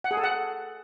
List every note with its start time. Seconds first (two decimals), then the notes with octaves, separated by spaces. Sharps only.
0.04 F#5
0.11 G#4
0.17 A4
0.24 F#5